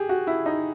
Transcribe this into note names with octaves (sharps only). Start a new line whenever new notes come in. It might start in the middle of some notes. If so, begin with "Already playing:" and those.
Already playing: G4 G#4
F#4
E4
D#4